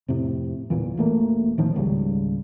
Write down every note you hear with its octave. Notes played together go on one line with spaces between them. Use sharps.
F2 A2 C3
G1 E2 A#2 E3
E1 A3 A#3
A2 D#3 F3
G#1 C#2 C#3 G3